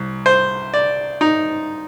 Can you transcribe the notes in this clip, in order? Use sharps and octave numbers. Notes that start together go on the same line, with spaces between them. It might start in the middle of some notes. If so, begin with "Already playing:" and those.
Already playing: C2
C5
D5
D#4